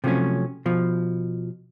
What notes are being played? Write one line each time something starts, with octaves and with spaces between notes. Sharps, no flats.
C3 F3 F#3 A3 C#4
B2 F3